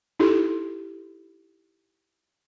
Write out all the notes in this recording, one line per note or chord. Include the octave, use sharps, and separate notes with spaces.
D#4 E4 G4 A4